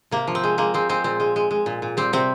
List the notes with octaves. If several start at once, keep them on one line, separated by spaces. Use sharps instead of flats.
C3 A#3
F3
C4
G#3
G#3 A#3
G#3 C4
G#3 C4
A#2 C4
G#3
G#3
G#3
A#2
A#2
G3 C4
C3 C4